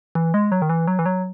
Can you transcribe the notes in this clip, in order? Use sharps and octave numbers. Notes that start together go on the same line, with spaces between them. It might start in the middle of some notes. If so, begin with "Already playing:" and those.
E3
G#3
F#3
D#3
E3
F#3
E3
F#3